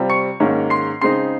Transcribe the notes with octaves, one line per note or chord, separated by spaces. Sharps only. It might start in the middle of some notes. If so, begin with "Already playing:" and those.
Already playing: C3 G3 C4 F4
C#6 C#7
G#2 D#3 A#3 C#4
C6 C7
C#3 G#3 C4 D#4 C6 C7